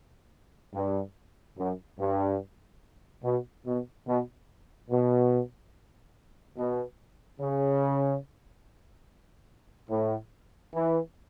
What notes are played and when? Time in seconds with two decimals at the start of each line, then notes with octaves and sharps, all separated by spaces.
0.74 G2
1.58 F#2
1.99 G2
3.24 B2
3.66 B2
4.07 B2
4.90 B2
6.57 B2
7.40 C#3
9.90 A2
10.73 E3